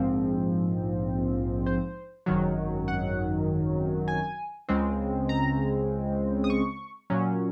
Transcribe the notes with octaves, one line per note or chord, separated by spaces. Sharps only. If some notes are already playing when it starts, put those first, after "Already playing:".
Already playing: A#1 G#2 F3 C4
C5
G#1 F#2 D#3 F#3
F#5
G#5
C#2 C#3 G#3 C4
A#5
D#6
C#6
A#2 F#3 C#4